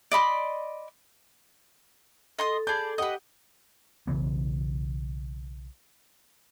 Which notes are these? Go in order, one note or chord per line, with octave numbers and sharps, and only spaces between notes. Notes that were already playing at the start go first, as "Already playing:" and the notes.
D5 D#5 B5 C6
A4 D#5 C6 D#6
G#4 D5 A5 B5 G6
G4 B4 D#5 F#5 D#6
B1 C#3 E3 B3